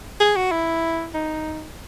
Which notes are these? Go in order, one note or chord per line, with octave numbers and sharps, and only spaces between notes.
G#4
F#4
E4
D#4